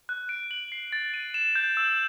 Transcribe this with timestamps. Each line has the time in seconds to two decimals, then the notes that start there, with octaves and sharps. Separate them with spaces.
0.09 F#6
0.29 D7
0.51 F#7
0.72 C7
0.93 A6
1.14 D#7
1.34 E7
1.55 G6
1.77 E6